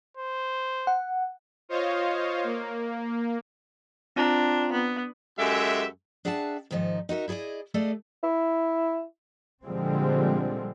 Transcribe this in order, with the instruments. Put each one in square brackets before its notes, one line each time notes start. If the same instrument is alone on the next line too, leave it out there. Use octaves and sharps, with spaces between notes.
[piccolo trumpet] C5
[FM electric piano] F#5
[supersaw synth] F4 C5 C#5 D#5 F5
A#3
[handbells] C4 F4 A#5 [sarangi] D4
[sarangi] B3
[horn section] F#2 G#3 G4 A4 E5
[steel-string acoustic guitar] D4 G#4 E5 F#5 G5 A5
G#2 D#3 F3 D#4
D#4 F#4 A#4 E5
E4 G#4 A4 D5 D#5
A3 G#4 A4 D5 D#5 F5
[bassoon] E4
[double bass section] A#2 D3 F3 G3 G#3 C4